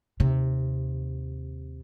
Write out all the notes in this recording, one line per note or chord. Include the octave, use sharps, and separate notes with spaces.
D#2 C3